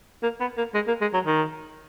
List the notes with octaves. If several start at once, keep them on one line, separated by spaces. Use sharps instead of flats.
A#3
B3
A#3
G#3
A#3
G#3
F#3
D#3